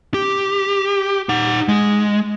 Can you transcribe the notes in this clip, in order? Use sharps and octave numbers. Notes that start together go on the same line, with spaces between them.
G4
D#4 F#5
G#3